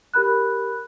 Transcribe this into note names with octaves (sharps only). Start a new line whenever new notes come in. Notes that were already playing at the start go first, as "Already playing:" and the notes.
G4 A#4 B5 F#6